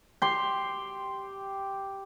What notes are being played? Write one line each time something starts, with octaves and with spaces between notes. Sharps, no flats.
G4 C6